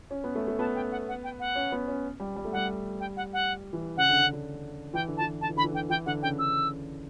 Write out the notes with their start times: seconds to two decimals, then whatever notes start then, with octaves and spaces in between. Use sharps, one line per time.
0.11 C#4
0.24 B3
0.35 A3
0.48 A3
0.59 B3 A5
0.75 G5
0.91 F#5
1.08 F#5
1.24 G5
1.40 F#5
1.56 C#4
1.72 B3
1.88 C#4
2.20 G3
2.36 G3
2.45 A3
2.52 G3 F#5
3.00 G5
3.17 F#5
3.33 F#5
3.73 E3
3.97 C#3 F#5
4.09 D3
4.21 C#3
4.33 D3
4.93 E3 G5
5.08 D3
5.17 A5
5.21 E3
5.41 D3 A5
5.49 E3
5.57 D3 B5
5.64 E3
5.71 D3 G5
5.90 E3 G5
6.06 D3 F#5
6.22 C#3 G5
6.38 D3 E6